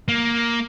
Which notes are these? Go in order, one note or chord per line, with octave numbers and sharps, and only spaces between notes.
A#3